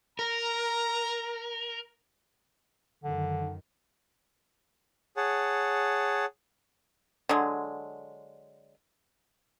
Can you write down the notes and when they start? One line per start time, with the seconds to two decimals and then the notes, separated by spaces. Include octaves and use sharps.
0.19 A#4 A#5
3.04 F#2 D3 D#3
5.17 G#4 C#5 F#5 A5
7.29 D3 F#3 G#3